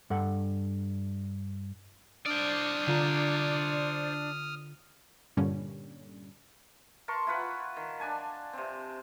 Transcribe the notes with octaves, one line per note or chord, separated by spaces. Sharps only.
G2 A4 F#5
D4 C5 D5 D#6 F6
D3 F4 A#5
G2 A#2 D3 G3 C#4
A#4 A5 C6 C#6
E4 F4 B4 F#5
D#3
D4 D5 G#5 A5
C3 C4